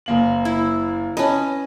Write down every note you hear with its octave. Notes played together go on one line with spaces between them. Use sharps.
F#1 A#3 F#7
E4
C#4 B4 D#5 A5